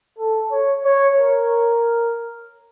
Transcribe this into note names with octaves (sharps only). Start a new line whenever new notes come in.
A4
C#5
C#5
A#4